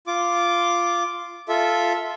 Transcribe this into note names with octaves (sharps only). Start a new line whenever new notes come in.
F4 D6
F4 A4 E5